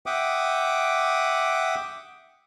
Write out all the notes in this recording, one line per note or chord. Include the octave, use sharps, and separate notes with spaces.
E5 F#5 G5 D6 D#6